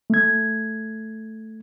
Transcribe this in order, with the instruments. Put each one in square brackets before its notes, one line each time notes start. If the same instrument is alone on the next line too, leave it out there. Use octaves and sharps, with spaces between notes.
[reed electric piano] A3 G#6